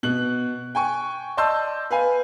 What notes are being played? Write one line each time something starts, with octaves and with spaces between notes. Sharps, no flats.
B2 F#6 F#7
G5 G#5 C#6
D5 D#5 A5 C6 E6 G6
B4 F5 G#5